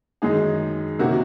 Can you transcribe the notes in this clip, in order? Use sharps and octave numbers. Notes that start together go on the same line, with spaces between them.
F#2 D#3 G#3 D#4 G#4
C3 D#3 A#3 C#4 F#4